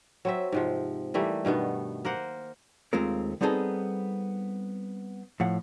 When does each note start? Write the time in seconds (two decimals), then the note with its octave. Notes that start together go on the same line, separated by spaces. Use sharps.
0.25 F#3 C4 E5
0.52 G#2 C3 F3
1.14 E3 G3 A3 A#3
1.45 G2 B2 D#3 B3
2.05 A#3 A#4 C5 F#5
2.93 D#2 G#3 A3 C4 F4 A#4
3.41 G3 B3 C4 D#4 G#4 A4
5.40 A2 F3 F#5